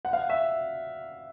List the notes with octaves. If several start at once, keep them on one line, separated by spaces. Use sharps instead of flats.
F#5
F5
E5